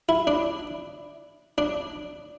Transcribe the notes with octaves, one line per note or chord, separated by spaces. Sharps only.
E4
D4
D4